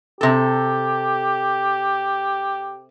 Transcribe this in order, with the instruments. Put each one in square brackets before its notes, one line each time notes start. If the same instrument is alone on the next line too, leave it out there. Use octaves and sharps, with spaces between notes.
[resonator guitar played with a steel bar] C3 A4 [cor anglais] G4